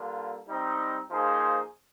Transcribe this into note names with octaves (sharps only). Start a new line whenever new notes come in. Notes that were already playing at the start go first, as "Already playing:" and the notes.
Already playing: D3 G3 A#3 D4 F4
G3 C4 D#4
F3 A#3 D#4 G#4 C5